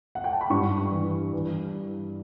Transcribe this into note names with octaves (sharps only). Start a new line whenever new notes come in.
F#5
G5
A5
B5
G2 C#6
E3
E3